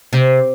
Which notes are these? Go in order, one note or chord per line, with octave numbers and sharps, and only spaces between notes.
C3